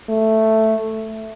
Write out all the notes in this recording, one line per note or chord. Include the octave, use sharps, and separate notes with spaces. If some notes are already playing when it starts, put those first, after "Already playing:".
A3